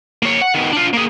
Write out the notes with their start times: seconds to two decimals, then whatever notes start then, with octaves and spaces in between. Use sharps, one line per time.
0.23 A#3 C#5
0.41 F#5
0.55 D#3 B3
0.73 D4 F4
0.93 A#3 G#4